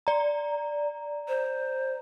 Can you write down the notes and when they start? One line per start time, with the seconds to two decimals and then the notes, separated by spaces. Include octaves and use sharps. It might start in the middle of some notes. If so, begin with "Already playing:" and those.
0.07 D5 A#5
1.28 C5